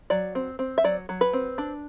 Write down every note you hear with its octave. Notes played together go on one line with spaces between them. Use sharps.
F#3 D5
C4
C4
E5
F#3 D5
F#3
B4
C4
D4